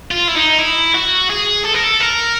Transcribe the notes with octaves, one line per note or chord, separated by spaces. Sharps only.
F4
E4
D#4
E4
F#4
G#4
A4
A#4
A4
A#4